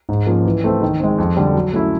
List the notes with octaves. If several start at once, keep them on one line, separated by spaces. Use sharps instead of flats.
G#2
F3 A#3 C#4
E3
A3 C4
D#3
G#3 C4
F2
D3 G3
F#3
A3 C#4 E4